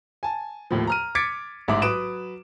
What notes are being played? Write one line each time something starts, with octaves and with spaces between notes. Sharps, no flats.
G#5 A5
D#2 A2 F3
A#5 F6 D#7
D6 G#6 A6 B6 C#7 D7
A1 G#2 E5 D6
F#3 B4 D#6 D7 E7